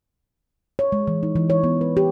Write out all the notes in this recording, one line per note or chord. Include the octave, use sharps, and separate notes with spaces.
C#5
G#3
E3
D#4
E3
C#5
B3
B4
G4